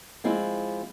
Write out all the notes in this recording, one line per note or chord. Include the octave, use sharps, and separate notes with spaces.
F3 G#3 C4 E4